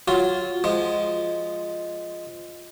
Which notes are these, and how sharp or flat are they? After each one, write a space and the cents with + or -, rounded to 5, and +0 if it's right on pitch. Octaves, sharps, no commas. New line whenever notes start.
F#3 +0 F4 +0
F3 +0 G#3 +0